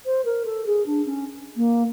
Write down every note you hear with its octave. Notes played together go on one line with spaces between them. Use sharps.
C5
A#4
A4
G#4
D4
C#4
A#3